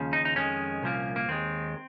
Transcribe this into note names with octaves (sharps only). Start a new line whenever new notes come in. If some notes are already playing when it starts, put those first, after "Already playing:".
Already playing: D#2 C#3 F3
D#4
D#4
F2 D#3 G#3 C#4
C2 A#2 F3 A#3
A#3
D#2 D#3 G#3 C4